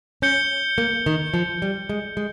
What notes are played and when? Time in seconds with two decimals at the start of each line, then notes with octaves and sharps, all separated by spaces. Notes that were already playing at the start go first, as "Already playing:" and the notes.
0.22 C#4 G6 C#7 G7
0.78 A#3
1.06 D#3
1.34 F3
1.62 G3
1.89 G#3
2.17 G#3